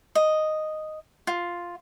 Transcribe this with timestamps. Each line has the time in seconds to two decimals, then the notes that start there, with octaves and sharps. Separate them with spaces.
0.15 D#5
1.27 F4